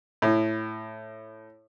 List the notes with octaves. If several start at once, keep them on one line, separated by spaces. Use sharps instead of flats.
A2